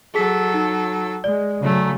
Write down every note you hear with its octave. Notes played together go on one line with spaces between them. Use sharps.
F#3 G#4 A4 B6
D#4
G#3 D5
C#3 F#3 A3